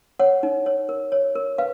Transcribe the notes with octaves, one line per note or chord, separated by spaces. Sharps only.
C#5 F#5
D#4
C#5
A#4
C#5
A#4
B4 F5